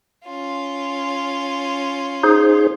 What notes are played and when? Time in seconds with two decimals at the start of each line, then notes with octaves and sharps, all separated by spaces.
0.25 C#4 F4
2.23 D#4 G#4 C5